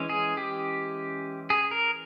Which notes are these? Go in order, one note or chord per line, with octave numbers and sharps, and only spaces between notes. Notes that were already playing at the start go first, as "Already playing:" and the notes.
Already playing: E3 G#3 C#4
G#4
G4
G#4
A#4